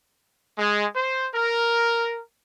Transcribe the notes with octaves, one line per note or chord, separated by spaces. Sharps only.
G#3
C5
A#4